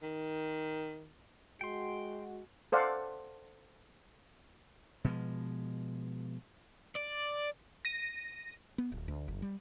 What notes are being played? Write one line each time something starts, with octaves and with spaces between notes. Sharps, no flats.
D#3
G#3 F#4 G5 C6
A4 C5 D5 F5 F#5
B2 F3 G#3
D5
A#6 D#7
B3
D1
D2
F#1
G3